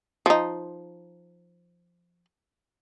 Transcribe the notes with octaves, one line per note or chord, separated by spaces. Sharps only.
F3 D#4